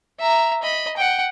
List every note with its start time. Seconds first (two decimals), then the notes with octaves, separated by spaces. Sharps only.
0.20 E5 A#5
0.62 D#5 B5
0.97 F#5 G5